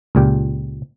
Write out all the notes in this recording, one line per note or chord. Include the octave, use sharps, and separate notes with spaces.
C#2 A#2 G4 G5